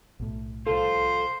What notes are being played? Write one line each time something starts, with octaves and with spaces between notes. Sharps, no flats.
B1 A2
C2 F3 F4 A4 C5